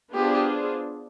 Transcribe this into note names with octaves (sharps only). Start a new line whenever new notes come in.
B3 D4 F4 G4 G#4 C5